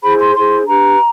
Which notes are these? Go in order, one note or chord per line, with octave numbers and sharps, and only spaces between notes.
E4 G#4 C5 B5
C6
E4 G#4 C5 C6
D4 G4 B4 A#5